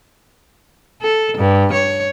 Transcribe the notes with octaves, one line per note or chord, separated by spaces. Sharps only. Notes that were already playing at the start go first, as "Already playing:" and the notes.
A4
G2
C#5